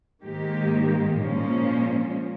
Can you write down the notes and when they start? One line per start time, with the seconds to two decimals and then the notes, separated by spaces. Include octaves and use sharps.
0.23 G#2 D#3 A#3 G4
1.16 A#2 F3 G#3 C#4